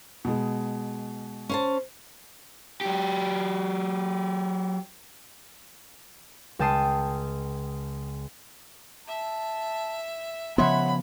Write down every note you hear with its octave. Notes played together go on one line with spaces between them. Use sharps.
B2 G#3
C#4 C5 A5
F#3 G4
C#2 G5 A5 D#6 C7
E5 A5
C#3 F3 G#3 B3 C#5 E5 F#5 B5